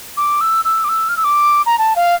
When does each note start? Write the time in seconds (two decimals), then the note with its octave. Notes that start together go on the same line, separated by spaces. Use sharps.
0.17 D6
0.41 E6
0.65 E6
0.84 D6
0.89 E6
1.09 F6
1.17 E6
1.24 D6
1.66 A#5
1.78 A5
1.96 F5